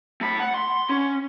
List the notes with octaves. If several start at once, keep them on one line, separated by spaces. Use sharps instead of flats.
A3 B5
F#5
C6
C#4